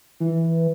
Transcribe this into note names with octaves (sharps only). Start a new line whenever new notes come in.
E3